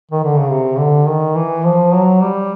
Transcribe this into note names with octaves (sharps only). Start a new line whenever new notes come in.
D#3
D3
C#3
C3
D3
D#3
E3
F3
F#3
G3